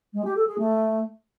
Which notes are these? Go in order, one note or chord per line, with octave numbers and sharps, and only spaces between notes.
G#3
G4
A4
G#4
A3